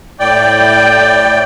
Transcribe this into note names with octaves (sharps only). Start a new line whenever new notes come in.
A2 D5 G5